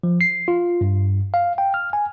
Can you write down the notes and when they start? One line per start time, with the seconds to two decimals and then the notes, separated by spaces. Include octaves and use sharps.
0.03 F3
0.21 C7
0.48 F4
0.81 G2
1.34 F5
1.58 G5
1.74 F6
1.93 G#5